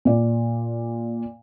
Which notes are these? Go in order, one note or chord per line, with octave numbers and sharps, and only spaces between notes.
A#2 D5